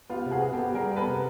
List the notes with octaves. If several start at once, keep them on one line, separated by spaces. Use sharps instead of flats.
B3 F4 G4
C3
F#4 G#4
B3
G4 A4
B3
G3 G#4 A#4
B3
A4 B4
C3